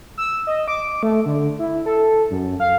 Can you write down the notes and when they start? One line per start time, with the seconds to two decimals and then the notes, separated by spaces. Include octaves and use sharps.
0.18 E6
0.47 D#5
0.68 D6
1.03 A3
1.26 D3
1.59 E4
1.86 A4
2.31 F#2
2.60 F5